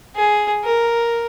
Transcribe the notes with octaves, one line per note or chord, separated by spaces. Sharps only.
G#4
A#4